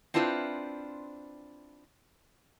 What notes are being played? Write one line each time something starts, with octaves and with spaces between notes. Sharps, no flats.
C4 D4 E4 F4 B4 C5